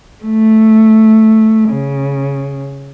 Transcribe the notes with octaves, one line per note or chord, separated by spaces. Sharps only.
A3
C#3